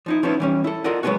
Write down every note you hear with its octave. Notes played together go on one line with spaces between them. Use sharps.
F3 D#4 E4
F3 B3 C#4 D#4 E4
E3 G3 C#4
E4 A4
F4 A4 A#4 D5 D#5 F#5
F#3 G#3 A3 B3 C#4 F#4